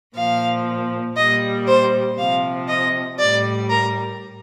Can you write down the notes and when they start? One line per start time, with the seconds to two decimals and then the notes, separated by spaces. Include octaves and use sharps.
0.15 A#2 F3 F5
1.16 A#2 G3 D#5
1.67 C5
2.18 C3 F3 F5
2.68 D#5
3.18 A2 G3 D5
3.69 A#4